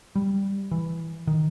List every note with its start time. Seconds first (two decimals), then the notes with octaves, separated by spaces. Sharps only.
0.16 G3
0.71 E3
1.27 D#3